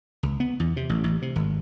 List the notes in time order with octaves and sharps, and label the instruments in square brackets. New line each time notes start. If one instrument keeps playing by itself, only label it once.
[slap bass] C#2
B3
E2
C3
A1
A1
C3
G#1